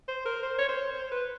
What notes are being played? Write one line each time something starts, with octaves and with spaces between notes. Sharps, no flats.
C5
A#4
C5
C#5
C5
C5
B4